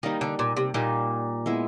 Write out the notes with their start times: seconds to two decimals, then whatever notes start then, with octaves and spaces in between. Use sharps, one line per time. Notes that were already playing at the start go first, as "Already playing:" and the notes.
0.03 D#3 G3 A#3 D#4 G4
0.21 D3
0.39 A#2
0.57 C3
0.74 A#2 G3 A#3 D#4 G4
1.46 G#3 B3 E4